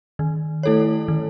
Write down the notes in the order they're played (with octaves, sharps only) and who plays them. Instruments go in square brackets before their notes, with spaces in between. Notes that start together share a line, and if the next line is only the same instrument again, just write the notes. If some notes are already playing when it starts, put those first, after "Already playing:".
[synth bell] D#3
A3 E4 A4 C#5
D#3